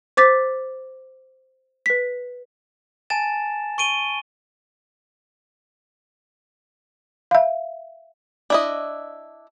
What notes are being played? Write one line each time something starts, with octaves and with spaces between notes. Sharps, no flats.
C5 D6 A6 B6
B4 B6
G#5 A5 A6 E7
C#6 D7 D#7 G7
E5 F5
D4 E4 D#5